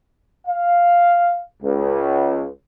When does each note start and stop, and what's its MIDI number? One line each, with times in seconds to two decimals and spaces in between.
0.48 1.40 77
1.63 2.45 37